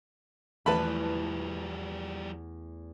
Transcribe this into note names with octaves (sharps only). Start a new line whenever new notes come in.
E2 F3 G3 A3 B4 A5 B5